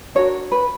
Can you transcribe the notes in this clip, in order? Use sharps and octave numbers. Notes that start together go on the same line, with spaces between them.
D4 F#4 A#4 C#5
B4